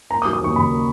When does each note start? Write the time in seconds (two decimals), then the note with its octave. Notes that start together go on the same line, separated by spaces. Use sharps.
0.10 A#3 A#5
0.22 D#6
0.25 F#3
0.33 D#6
0.41 D#2 C#6
0.56 C#3 B5
0.71 A#3